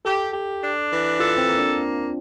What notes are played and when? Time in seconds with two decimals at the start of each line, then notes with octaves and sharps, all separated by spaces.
0.05 G4 A4
0.33 G4
0.63 D4
0.90 E3
1.19 F4 A4
1.38 C4
1.48 A#3
1.57 D4